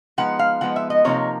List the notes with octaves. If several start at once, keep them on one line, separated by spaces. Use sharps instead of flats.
F3 G#3 B3 D#4 F#5
F5
F3 G#3 B3 D#4 F#5
E5
D#5
C3 F3 A#3 D#4 C#5